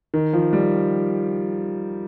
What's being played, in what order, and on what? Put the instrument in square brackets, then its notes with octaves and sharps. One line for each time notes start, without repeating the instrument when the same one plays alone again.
[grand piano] D#3
F3
G3